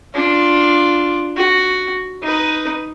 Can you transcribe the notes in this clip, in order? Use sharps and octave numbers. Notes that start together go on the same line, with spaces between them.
D4 F4
F#4
D#4 B4